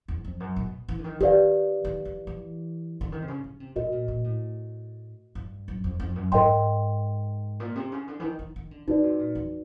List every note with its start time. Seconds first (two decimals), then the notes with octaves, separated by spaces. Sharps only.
0.08 E2
0.25 F2
0.40 F#2
0.56 B2
0.88 E3
0.99 D3
1.04 D#3
1.20 D#3 G4 B4 D5 F5
1.85 D#3
2.05 E3
2.27 E3
3.01 D3
3.12 D#3
3.22 C3
3.28 C#3
3.44 C#3
3.60 C3
3.76 B2 F#4 A#4 D#5
3.92 A#2
4.08 A#2
4.24 A2
5.35 G2
5.68 F#2
5.84 F2
6.00 F2
6.16 F#2
6.32 G#2 A#4 D#5 G5 C6
7.60 A#2
7.76 C3
7.92 C#3
8.08 D3
8.20 E3
8.24 D#3
8.39 D#3
8.56 D#3
8.71 D3
8.87 D3 D#4 F#4 B4 D5
9.03 C3
9.19 A#2
9.35 E2